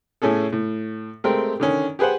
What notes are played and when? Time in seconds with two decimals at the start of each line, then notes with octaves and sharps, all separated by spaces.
0.22 A2 A3 C#4 G#4 A4
0.53 A2
1.24 G#3 A3 C4 G4 A#4 G5
1.60 D3 D#3 C#4
1.99 G4 G#4 B4 C5 F#5